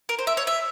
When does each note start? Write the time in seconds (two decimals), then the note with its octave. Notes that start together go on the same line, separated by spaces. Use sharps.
0.09 A#4
0.19 C5
0.27 E5
0.37 C#5
0.47 E5